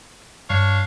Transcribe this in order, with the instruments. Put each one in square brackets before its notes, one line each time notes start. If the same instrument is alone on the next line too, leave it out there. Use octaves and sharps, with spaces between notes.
[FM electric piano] G2 C#7 [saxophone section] D4 C#5 F5